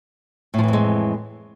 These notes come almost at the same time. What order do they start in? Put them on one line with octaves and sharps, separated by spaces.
A2 F3 E3 F2 G#3